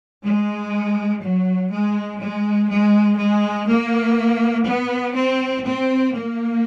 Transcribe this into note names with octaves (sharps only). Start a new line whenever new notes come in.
G#3
F#3
G#3
G#3
G#3
G#3
A#3
B3
C4
C4
A#3